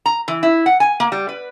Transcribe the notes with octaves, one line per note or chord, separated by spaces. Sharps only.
A#5
E3
E4
F#5
G#5
A#3
G3
B4